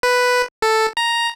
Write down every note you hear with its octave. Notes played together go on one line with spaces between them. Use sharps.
B4
A4
A#5